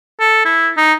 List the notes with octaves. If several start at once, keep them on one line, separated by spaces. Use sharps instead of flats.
A4
E4
D#4